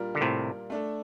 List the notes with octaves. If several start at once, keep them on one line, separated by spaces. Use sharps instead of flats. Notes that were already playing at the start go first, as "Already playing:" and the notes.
Already playing: A#2 G3 D4 F4 A#4
D3
A2 C3
A3 D4 A4